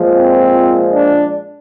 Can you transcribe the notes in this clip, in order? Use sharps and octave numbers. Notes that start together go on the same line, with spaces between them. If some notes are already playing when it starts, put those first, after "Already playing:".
Already playing: A#2 F3 G#3
C4
D4